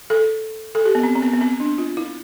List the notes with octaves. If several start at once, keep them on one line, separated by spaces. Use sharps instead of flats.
A4
A4
G4
B3
C4
C4
B3
B3
C4
D4
F4
E4